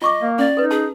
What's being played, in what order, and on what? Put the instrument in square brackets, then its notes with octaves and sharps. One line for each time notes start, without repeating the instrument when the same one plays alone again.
[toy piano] F4 C#6 D6 [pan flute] D#5
[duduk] A#3
[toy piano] C#4 [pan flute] D5
[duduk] D#4 [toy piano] A4 B4
[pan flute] G#4 [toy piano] A5